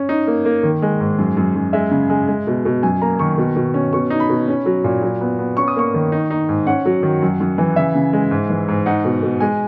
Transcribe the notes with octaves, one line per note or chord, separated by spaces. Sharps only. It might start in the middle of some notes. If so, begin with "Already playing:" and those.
Already playing: C#4
D#4
A#3
A#3
D#3
G#3
G#2
F#2
F#2
F#2
G#3 E5
C#3
G#3
G#3
B2
B2
F#2 G#5
A#3 A#5
D#3 C#6
B2
B2
C#4
B2 C#6
D#4
B5
B2
C#4
F#3
A#2
F#3
B3
B3
C#4 C#6
D#6
A#3 C#6
D#3
D#4
D#4
G#2
C#4 F#5
F#3
D#3
F#2
F#2
E3
C#3 E5
C#3
G#3
G#2
E3
G#2
D#4 F#5
B2
B2
G#3 G#5